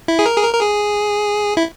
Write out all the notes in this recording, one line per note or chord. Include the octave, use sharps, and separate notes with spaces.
E4
G#4
A#4
G#4
A#4
A#4
G#4
E4